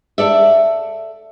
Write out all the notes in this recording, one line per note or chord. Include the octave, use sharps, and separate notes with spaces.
A4 D5 E5